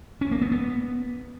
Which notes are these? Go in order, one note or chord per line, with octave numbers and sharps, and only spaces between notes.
C#4
A#3
B3
B3